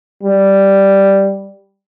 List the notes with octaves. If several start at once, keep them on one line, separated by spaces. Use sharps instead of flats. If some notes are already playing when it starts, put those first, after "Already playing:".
G3